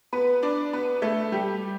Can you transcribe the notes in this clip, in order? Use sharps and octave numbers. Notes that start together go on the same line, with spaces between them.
B3 B4
D4 D5
B3 B4
A3 A4
G3 G4